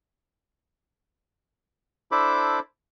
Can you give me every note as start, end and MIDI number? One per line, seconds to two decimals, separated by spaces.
2.12 2.59 62
2.12 2.59 64
2.12 2.59 69
2.12 2.59 72
2.12 2.59 83
2.12 2.59 86